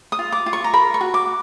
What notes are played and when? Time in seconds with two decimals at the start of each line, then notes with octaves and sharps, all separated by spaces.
0.12 D#6
0.19 F4
0.32 D6
0.46 F4
0.53 C#6
0.64 A#5
0.73 A#4 B5
0.94 C#6
1.01 F#4
1.14 D6